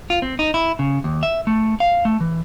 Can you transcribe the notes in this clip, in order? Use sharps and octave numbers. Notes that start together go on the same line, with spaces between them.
F4
C4
D#4
E4
C#3
D#2
E5
A3
F5
A3
E3